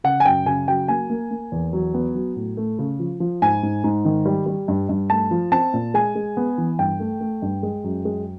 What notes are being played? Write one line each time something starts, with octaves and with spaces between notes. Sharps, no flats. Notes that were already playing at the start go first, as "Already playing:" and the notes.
C#3 F#5
G#5
F#2 G5
C#3 G#5
F#3 G5
A#3 G#5
A#3
A#3
E2
F#3
B3
F#3
A2
A3
C#3
F3
F3
G#2 G#5
G#2
G#2
D#3
G3
G3
G2
G2
A3 A5
F3
C4 A5
A#2
G#3 G#5
G#3
B3
E3
G2 G5
A3
A3
G2
G#3
F#2
G#3